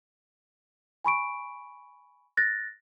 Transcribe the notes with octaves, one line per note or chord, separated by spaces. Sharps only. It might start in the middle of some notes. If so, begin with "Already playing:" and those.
G#5 B5 C#6 D7
F#6 A6 A#6